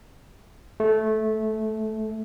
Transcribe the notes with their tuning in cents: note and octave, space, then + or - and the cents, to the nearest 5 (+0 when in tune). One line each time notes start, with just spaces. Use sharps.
A3 -15